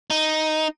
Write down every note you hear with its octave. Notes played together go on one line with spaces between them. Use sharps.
D#4